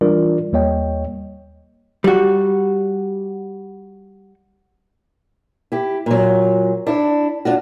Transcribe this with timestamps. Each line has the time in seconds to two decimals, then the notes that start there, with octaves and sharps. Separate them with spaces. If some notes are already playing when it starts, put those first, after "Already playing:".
0.01 E3 G3 D4 F4 A#4 D5
0.53 D#2 G3 A#3 C#5 D#5 G5
2.04 G3 F#4
5.72 E4 G4
6.06 A#2 F#3
6.87 D4 E4
7.45 D4 F4 F#4